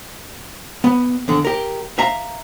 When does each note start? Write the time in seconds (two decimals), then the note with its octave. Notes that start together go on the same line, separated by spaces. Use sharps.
0.84 B3
1.28 E2 D3
1.45 G4 A#4
1.98 E5 F5 A#5